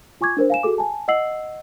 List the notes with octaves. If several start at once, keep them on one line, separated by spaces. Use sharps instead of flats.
F4 G#5 C#6 D6 G#6
D4 A#4 C5
F5 G#5 E7
F#4 G#4 A4 D6
G#5 A5
D#5 F#5 E6 C7 F#7